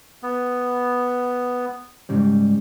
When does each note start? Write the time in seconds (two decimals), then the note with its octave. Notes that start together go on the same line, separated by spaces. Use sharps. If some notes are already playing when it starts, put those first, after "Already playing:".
0.23 B3
2.09 G#2 C#3 G3